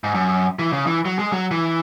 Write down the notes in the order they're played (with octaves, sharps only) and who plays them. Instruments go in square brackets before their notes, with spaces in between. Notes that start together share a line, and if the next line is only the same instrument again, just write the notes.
[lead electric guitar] G#2
F#2
E3
C#3
E3
F#3
G#3
F#3
E3